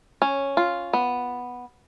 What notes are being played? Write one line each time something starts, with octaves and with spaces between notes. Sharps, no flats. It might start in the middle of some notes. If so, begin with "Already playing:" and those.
C#4
F4
B3